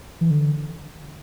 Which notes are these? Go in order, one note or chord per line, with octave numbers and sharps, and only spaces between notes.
E3
D3